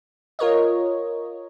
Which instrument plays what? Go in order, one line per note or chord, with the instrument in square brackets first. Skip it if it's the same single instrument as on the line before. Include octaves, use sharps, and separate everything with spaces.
[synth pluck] F4 A#4 C#5 D#5